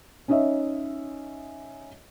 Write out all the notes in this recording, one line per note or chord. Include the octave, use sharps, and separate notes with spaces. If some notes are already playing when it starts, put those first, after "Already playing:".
C#4 D#4 C#5 D#5 E5